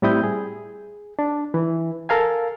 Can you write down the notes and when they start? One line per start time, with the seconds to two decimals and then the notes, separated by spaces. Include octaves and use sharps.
0.02 A2 G3 C4 E4 D#6 G6
0.24 G#4
1.19 D4
1.54 E3
2.09 A4 A#4 F5 G#5